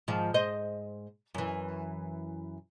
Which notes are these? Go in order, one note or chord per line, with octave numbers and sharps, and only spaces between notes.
G#2 D#3 F3
G#2 C5 D#5
F#2 E3